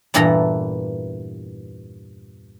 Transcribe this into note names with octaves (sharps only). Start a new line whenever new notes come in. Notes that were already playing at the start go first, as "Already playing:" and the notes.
E2 G2 A#2 E3 A4 A#5